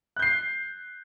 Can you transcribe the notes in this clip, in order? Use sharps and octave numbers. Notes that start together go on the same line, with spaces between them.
F#6 G6 C7